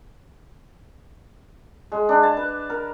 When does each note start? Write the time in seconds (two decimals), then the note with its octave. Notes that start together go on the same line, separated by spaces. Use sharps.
1.92 G#3
2.09 D4
2.23 A5
2.37 B4
2.70 A#4